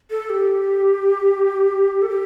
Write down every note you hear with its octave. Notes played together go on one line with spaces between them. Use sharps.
A4
G4
A4
G4